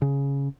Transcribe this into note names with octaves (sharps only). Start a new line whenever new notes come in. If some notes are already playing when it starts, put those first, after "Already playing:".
C#3